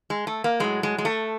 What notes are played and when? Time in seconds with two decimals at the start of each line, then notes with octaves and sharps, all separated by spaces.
0.10 G#3
0.27 A3
0.44 A#3
0.60 A2 F#3 G#3
0.83 G#3
0.98 G#3
1.05 A3